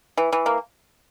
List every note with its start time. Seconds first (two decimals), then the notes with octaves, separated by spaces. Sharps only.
0.17 E3
0.32 E3
0.46 A#3